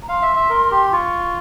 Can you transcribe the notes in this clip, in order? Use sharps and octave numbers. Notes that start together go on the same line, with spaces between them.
A#5
F5 C6
E5
E5
A#4
G4
F4 C#6